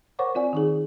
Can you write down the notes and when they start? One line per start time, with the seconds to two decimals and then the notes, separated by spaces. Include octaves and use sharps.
0.19 A#4 C5 C#5 F#5 C#6 D6
0.35 C4 F4 D5 G#5
0.53 D#3 D#4 G#4